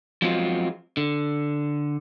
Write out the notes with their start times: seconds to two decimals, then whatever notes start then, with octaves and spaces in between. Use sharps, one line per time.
0.22 F3 F#3 G#3 B3 C4 F4
0.97 D3